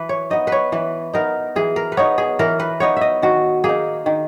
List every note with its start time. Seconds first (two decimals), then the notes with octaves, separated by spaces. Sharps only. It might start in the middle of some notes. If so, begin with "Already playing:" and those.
Already playing: E3 B4
0.09 C#5
0.30 B3 D#4 D#5
0.47 B4
0.52 C#5
0.72 E3 B4
1.13 B3 D#4 A#4
1.56 E3 G#4
1.76 A#4
1.92 B4
1.97 B3 D#4 C#5
2.18 G#4
2.39 E3 A#4
2.60 B4
2.80 B3 D#4 C#5
2.97 D#5 E5
3.22 D#3 F#4
3.64 A#3 G#4
3.69 D#4
4.06 D#3